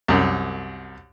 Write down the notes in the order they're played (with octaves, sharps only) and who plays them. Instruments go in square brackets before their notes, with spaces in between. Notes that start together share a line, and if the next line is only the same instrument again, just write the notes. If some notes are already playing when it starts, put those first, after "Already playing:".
[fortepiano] C2 F#2